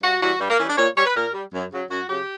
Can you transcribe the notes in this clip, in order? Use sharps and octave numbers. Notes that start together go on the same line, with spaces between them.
G2 F#4
E3 G3 F#4
G2 G3
A#3
E3 G3 C#4
D4
A#2 C#5
G3 C#5
B4
A#2 A#4
G3
F#2
C#3 F#3
F#2 F#4
C#3 F#3 G4